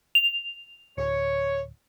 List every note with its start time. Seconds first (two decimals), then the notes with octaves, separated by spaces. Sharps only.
0.15 F7
0.98 D1 C#5